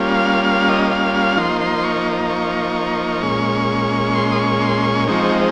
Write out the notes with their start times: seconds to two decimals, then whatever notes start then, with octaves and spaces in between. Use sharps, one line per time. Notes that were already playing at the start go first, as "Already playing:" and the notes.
Already playing: G3 A#3 C#4 F4
0.15 F5
0.44 F5
0.69 D#5
0.92 F5
1.14 F5
1.37 F3 A#3 D#4 C6
1.61 C6
1.83 C#6
2.30 C#6
3.23 A#2 G#3 C#4
4.15 C6
4.32 D#6
4.39 C#6
4.61 C6
4.84 C#6
5.07 F3 G#3 C4 D#4 C#6